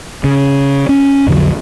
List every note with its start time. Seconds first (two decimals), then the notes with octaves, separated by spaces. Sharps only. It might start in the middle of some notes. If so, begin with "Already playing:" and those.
0.24 C#3
0.89 C#4
1.26 B1 F2 D3 F#3